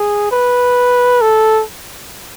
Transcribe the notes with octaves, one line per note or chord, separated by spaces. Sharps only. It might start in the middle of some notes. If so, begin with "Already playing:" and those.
Already playing: G#4
B4
A4